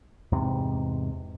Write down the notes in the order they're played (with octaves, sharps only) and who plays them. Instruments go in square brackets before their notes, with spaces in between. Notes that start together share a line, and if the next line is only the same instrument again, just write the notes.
[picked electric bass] E2 G#2 C3